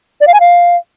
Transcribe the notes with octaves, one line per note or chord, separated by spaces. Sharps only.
D5
F5
G#5
F5